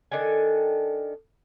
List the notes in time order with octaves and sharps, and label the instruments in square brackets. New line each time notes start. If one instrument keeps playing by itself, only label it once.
[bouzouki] D#3 D4 A4 G#5